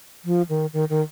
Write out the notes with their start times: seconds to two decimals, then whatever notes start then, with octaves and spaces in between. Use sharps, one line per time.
0.25 F3
0.49 D#3
0.73 D#3
0.90 D#3